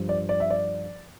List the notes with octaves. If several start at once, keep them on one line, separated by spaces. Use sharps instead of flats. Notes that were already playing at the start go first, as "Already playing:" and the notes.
Already playing: G2 F3
D5
D5
E5
D5